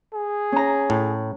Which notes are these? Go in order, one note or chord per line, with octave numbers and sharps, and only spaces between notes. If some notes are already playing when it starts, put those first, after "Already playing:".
G#4
C#4 A#5
A2